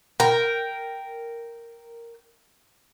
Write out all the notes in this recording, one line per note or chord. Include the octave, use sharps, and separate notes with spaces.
A#4 G5